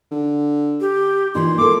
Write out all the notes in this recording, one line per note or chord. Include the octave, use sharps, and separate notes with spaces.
D3
G4
A#2 E3 D#4 C6
A#3 F4 A4 D6